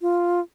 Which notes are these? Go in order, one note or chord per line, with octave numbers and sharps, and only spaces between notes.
F4